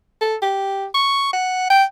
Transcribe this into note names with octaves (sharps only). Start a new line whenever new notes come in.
A4
G4
C#6
F#5
G5